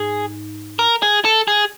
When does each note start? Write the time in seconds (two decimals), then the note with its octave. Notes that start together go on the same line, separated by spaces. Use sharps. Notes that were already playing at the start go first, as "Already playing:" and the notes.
Already playing: G#2 G#4
0.79 A#4
1.02 G#4
1.25 A4
1.48 G#4